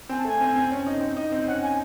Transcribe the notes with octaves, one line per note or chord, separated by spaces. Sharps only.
C4 G#5
A5
A3 G#5
C4
C4
C#4
D#4
C4
D#4
C4
C#4 F#5
G#5